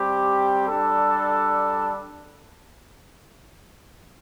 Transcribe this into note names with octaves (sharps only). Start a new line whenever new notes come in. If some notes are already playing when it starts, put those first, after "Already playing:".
Already playing: G3 C4 G4
G3 D4 A4